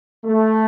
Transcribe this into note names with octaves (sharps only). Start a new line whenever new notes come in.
A3